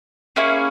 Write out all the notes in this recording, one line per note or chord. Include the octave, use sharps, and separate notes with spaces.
A#3 C#4 E4 G#4